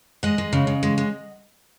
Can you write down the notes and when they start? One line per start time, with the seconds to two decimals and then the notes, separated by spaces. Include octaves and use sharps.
0.23 G#3 D#5 F#5
0.38 G#3
0.53 C#3
0.67 C#3
0.83 G#3
0.98 G#3